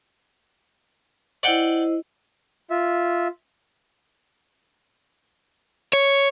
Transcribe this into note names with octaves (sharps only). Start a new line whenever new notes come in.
E4 C5 D5 D#5 F#5 G5
F4 E5
C#5